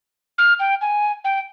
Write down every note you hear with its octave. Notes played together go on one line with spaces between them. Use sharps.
F6
G5
G#5
G5